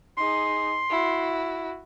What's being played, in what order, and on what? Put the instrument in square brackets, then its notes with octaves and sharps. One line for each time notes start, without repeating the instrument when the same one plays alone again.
[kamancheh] D#4 G#4 [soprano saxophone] C6
[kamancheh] E4 F#4